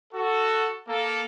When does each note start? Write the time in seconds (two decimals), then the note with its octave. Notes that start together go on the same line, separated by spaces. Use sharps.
0.13 F#4 A4
0.88 A#3 A4